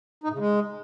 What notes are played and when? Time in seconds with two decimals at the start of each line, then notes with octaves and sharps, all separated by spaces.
0.24 D#4
0.29 A2
0.34 C#3
0.39 G#3